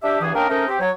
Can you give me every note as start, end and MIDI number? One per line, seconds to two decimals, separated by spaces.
0.03 0.19 62
0.03 0.19 67
0.03 0.19 76
0.21 0.33 40
0.21 0.33 43
0.21 0.33 52
0.21 0.33 68
0.21 0.33 87
0.35 0.48 58
0.35 0.48 61
0.35 0.48 62
0.35 0.48 70
0.35 0.48 75
0.35 0.48 79
0.50 0.67 57
0.50 0.67 60
0.50 0.67 61
0.50 0.67 63
0.50 0.67 70
0.68 0.78 60
0.68 0.78 67
0.68 0.78 79
0.80 0.91 54
0.80 0.91 73